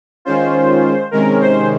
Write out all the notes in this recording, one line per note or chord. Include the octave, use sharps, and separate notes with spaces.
D#3 G#3 C#4 F4 C5
C3 D#3 G#3 C#4 A#4
C5